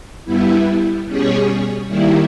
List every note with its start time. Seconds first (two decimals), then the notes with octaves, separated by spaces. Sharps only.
0.24 G2 G3 B3 E4
1.06 B2 G3 C#4 G#4 C#5
1.88 D#3 G3 A#3 E4